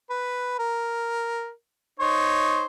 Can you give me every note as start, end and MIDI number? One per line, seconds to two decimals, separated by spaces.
0.10 0.55 71
0.59 1.50 70
2.00 2.66 63
2.00 2.66 72
2.00 2.66 73